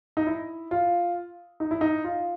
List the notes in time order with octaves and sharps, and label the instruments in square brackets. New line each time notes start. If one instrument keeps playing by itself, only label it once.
[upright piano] D#4
E4
F4
D#4
E4
D#4
F4